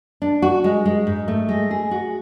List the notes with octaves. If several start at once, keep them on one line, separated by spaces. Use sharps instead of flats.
D4
F#4
G#3
G#3
G#2
A3
G#3
G#4
F#4